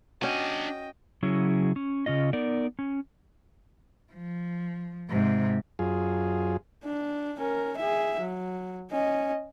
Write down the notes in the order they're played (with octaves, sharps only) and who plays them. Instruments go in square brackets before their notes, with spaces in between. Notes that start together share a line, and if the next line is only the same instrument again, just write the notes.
[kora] C#4 F#4 [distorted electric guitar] D4 G#5 [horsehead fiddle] D#5 G5
[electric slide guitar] C#3 F#3 C#4 E4 G#4
C#4
C#3 C#4 F4 D#5
B3 D#4 A#4 D5
C#4
[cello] F3
G#2 C3
[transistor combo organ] F#2 F4 G#4
[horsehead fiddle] D4
C#4 A#4
G#4 E5
F#3
C#4 D#5